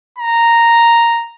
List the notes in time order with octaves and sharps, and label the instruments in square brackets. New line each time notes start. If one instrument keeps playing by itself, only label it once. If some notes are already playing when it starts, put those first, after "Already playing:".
[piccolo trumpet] A#5